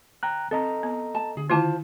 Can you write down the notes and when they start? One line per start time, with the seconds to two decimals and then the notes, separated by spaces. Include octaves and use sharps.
0.23 G5 A#5 F#6
0.51 C4 A4 D#5 A#5
0.83 B3
1.15 A5
1.37 D3 G#4
1.50 D#3 E4 F4 C5 A5